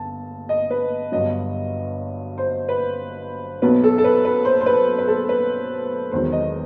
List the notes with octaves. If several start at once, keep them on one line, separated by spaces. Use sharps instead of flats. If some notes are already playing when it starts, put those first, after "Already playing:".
Already playing: G1 A5
D#5
B4
G1 G2 F#3 D#5
C5
B4
B1 B2 F#3 B4
A4
A4
B4
B4
C5
C5
B4
B4
A4
B4
E1 E2 D#3 F#3 C5
D#5